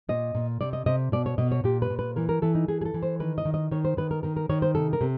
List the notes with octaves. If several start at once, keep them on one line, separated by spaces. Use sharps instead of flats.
A#2 D#5
A#2
C3 D5
D#5
C3 D#5
B2 D5
C#5
B2 D#5
C#5
A#2 G4
B4
A#2
B4
E3 A#4
A#4
E3 A4
D#4
E3 G#4
G#4
A4
E3
C5
D#3 B4
D#5
D#3
D#5
D#3 C#5
C5
D#3 B4
A#4
D#3 A#4
A#4
D#3 C#5
C5
C3 A4
A#4
C3